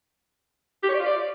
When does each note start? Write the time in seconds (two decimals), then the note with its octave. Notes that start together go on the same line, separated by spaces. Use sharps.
0.83 G4
0.89 C#5
0.94 D5
1.00 F4
1.05 D5